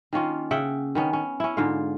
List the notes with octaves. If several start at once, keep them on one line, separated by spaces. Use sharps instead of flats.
D#3 A#3 C#4 F4
C#3 E5 F#5 G5
D#3 B3 C#4
C#4
C#4 E4
G#2 D3 F4 F5